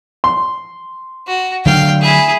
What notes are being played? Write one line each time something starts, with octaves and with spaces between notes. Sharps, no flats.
C6
F#4
D3 F#3 A3 F5 G5
E4 G#4